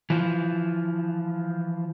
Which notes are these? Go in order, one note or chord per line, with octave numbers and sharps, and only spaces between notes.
E3 F3